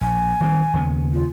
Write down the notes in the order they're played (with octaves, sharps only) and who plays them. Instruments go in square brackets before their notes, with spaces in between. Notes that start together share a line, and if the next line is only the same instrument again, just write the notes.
[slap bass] A#1 [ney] G#5
[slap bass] D#3 G3 C4
D#2 C#3 B3
[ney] F4